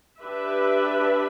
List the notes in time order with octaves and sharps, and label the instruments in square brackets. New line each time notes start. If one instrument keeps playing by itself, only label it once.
[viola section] D4 G4 B4 E5